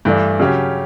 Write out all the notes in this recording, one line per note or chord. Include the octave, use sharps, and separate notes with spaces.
G2 E3 A3 D4
C#3 F#3 C#4 G4